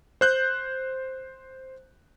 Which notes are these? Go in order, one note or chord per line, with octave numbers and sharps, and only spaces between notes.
C5 F#6 G6